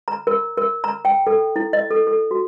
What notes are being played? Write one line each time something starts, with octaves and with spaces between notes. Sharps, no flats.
A#5
A#4
A#4
A#5
G5
A4
E4
D#5
A4
A4
F#4